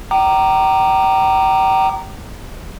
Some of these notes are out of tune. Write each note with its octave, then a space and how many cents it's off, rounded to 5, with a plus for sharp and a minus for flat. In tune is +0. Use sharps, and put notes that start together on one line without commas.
G5 -35 A#5 -5 D6 +25